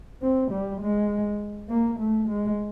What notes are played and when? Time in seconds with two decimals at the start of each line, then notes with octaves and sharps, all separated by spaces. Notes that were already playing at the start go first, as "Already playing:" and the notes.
0.22 C4
0.52 G3
0.82 G#3
1.70 A#3
2.00 A3
2.29 G#3